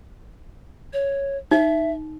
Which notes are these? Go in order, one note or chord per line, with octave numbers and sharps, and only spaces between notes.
C#5
D#4 E5